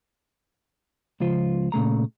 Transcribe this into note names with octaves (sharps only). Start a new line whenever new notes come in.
C#2 F3 F4 C5
A#2 C#3 A3 A#5